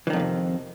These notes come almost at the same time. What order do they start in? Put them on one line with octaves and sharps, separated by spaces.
E3 D#3 F2 A2 C3